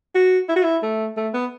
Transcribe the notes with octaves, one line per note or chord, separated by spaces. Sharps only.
F#4
E4
F#4
E4
A3
A3
B3